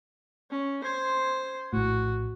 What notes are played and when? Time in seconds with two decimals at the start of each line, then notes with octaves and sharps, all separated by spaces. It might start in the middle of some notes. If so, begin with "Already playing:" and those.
0.51 C#4
0.84 C5 C6 G#6 C7
1.73 A#1 A2 F#4